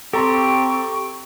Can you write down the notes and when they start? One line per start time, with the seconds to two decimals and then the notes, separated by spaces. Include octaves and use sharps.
0.13 C4 G4 A4 A#5 C6 C#6